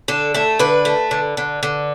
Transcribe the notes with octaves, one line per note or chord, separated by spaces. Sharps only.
D3 A4
A3 A4
D3 B4
A3
D3
D3
D3